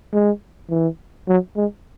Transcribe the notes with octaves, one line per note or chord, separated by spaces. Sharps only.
G#3
E3
F#3
G#3